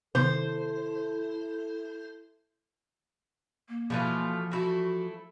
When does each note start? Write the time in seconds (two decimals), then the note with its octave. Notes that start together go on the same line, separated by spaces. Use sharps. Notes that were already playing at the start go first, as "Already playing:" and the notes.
0.15 C3 D#3 B3 E4 A4 C5
3.69 A#3
3.90 B2 E3 F3 A3 F4
4.52 A3 E4 F#4